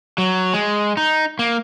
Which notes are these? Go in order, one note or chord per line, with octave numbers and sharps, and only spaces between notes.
F#3
G#3
D#4
A#3